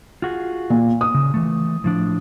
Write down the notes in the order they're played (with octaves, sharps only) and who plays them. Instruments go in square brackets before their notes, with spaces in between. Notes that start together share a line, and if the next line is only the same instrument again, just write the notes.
[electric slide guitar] F4 F#4 G#4
[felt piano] A#2
D#6
[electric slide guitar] C#3
E3 A3
A2 F3 D4